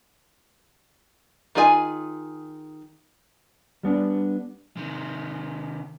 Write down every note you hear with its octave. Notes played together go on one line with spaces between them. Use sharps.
D#3 F4 G#4 G#5
G3 B3 D4
C3 D#3